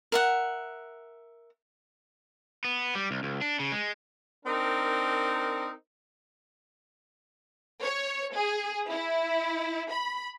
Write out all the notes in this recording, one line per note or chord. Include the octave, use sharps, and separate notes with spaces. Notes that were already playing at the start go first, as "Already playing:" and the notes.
A#4 E5 F#5
B3
G3
C2
C#2
D4
C#3
G#3
C4 D4 D#4 A#4
C#5
G#4
E4
B5